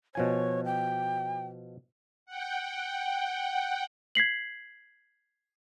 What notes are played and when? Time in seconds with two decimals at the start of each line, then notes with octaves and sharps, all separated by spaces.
0.15 B2 F3 C#5 G#5
0.65 G5
2.26 F#5 G5
4.15 G#6 B6 C7 F#7